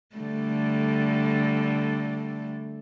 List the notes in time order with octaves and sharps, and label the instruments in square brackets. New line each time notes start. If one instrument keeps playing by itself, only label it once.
[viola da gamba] D3 G3 A3